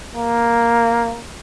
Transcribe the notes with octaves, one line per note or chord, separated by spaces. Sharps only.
A#3